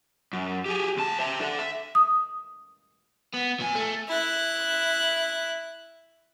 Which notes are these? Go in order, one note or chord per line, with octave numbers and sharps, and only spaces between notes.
F#2
G4 G#4
D2 A5
C5 E5
D4 A4
E5
D#6
B3
A#2 G#5
A3
E4 F#6